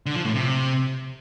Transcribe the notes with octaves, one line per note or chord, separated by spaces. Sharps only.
D3
F3
A2
C3